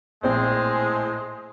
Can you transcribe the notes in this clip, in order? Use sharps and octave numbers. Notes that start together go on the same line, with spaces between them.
A#1 A2 G#3 C4 C5